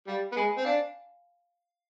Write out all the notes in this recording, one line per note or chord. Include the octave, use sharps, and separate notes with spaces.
G3 F5
B3
G#3 G#5 B5
C4
D4 F5